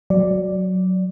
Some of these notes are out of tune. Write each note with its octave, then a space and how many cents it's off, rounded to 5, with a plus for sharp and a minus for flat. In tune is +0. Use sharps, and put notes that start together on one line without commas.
F#3 +0 D5 +0